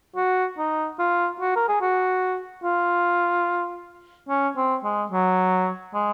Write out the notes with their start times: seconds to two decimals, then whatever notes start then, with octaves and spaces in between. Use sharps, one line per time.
0.16 F#4
0.58 D#4
0.99 F4
1.40 F#4
1.56 A#4
1.68 G#4
1.81 F#4
2.64 F4
4.29 C#4
4.57 C4
4.84 G#3
5.12 F#3
5.94 G#3